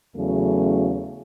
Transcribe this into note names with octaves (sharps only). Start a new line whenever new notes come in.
E2 C#3 F#3 A3